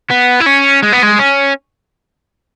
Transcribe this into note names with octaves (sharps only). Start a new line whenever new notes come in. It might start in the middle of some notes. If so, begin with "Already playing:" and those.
B3
E4
C#4
G#3
B3
G#3
C#4